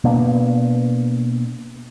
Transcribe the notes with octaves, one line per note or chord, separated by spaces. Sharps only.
B2 A#3 B3 D4